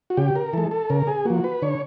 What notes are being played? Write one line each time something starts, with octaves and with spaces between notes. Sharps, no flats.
F#4
C#3 G4
A#4
E3 G#3 A4
A4
C#3 A#4
G#4
F3 A#3 F#4
B4
D3 C#5